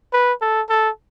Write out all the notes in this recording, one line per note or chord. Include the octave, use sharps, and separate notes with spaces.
B4
A4
A4